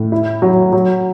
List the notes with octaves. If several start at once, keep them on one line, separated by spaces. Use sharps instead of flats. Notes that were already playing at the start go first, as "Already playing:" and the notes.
Already playing: A2
E4
F#3
F#3